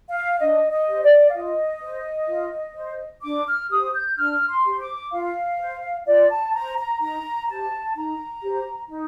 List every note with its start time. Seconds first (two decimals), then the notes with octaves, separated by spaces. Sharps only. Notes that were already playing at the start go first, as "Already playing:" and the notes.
0.09 F5
0.40 D4 D#5
0.71 D#5
0.88 G4 C5
1.03 D5
1.30 F5
1.34 F4 D#5
1.82 C5
2.28 F4
2.76 C5
3.23 D4 D6
3.47 F6
3.70 G4 C5 D#6
3.94 G6
4.17 D4 F6
4.49 C6
4.64 G4 C5
4.80 D6
5.12 F4 F5
5.59 C5
6.06 F4 D5
6.29 A5
6.53 C5 A#5
6.78 A#5
7.01 D#4 A#5
7.48 G4 C5 A5
7.96 D#4 A#5
8.42 G4 C5
8.89 D#4